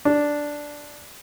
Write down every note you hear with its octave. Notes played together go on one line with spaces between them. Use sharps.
D4